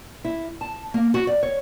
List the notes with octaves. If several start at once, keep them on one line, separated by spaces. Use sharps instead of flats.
E4
A5
A#3
F#4
D5
C#5